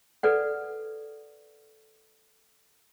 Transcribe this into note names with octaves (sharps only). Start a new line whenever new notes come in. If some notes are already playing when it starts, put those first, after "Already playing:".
A4 B4 D5 F#5